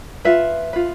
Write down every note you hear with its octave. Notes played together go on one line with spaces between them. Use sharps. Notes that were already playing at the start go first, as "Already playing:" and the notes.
F4 B4 E5
F4 B4